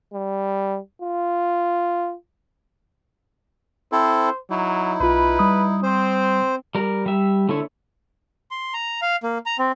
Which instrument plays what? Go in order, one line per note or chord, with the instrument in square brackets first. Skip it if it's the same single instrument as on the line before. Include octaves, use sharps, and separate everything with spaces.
[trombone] G3
F4
[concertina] C4 E4 A4 [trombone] C5
[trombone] F#3 [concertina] D#4 E4
[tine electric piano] B1 F4 [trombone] B4
[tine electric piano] G3 D#6
[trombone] C4 [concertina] C5
[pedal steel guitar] G3 A#4
G3 E5
D3 A3 E4 C#5
[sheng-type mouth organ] C6
A#5
F5
A#3
A#5
C4